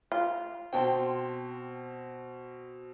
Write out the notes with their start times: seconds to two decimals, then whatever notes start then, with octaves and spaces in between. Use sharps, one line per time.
0.12 F4
0.73 B2 C4 G5 A5 C6